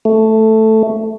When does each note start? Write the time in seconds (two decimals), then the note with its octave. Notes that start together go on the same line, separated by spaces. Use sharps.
0.05 A3